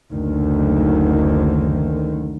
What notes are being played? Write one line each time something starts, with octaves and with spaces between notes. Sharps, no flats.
F#1 D2 D#3